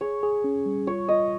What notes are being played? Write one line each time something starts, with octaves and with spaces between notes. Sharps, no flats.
G#4 C#5
G#4
C#4
G3
F4 C#5
F4 D#5